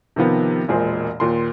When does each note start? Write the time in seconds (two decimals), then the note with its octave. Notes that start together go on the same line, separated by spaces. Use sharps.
0.16 C3 D#3 F3 B3
0.68 E1 A#2 G#3 G#4 C5
1.20 D#2 A#2 C6